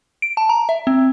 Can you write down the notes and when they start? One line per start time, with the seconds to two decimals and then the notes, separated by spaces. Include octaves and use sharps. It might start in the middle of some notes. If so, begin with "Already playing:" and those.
0.22 D7
0.37 A5
0.49 A#5
0.69 E5
0.87 C4